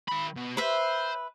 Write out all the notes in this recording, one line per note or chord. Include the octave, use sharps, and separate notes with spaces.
D#3 B5
B2
B4 C5 E5